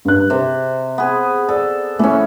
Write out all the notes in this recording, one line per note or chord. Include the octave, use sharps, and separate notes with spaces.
G2 F#6
C3 G4 C5
B3 G#4
A4 D5
E3 A3 C#4